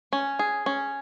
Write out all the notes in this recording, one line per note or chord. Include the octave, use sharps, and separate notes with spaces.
C#4
G#4
C#4